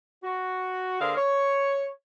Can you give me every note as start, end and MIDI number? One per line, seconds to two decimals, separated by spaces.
0.23 0.99 66
1.01 1.16 50
1.01 1.16 58
1.01 1.16 68
1.01 1.16 70
1.01 1.16 72
1.01 1.16 77
1.17 1.87 73